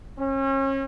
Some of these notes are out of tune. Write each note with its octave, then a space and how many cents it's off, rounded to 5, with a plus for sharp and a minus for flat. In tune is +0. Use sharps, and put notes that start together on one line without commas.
C#4 -35